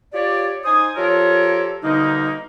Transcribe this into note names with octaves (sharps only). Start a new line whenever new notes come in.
F4 G4 C#5 D5
D#4 C5 G#5 D#6
F3 F4 G4 A4 A#4 C#5
B2 D3 G3 A#3 D#4